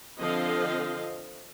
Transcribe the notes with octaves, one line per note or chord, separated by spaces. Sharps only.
D3 F3 C4 D#5 F5